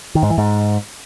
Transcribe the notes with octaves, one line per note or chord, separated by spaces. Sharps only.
D#3
G#2
E3
G#2